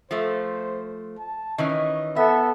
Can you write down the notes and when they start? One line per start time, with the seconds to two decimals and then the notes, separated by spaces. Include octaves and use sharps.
0.11 F3 A3 C5
1.19 A5
1.58 D#3 E3 C#4 D#5
2.16 B3 A4 E5